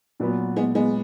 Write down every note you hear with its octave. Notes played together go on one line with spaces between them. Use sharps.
A#2 F#3 B3 F#4
G#3 B3
G#3 B3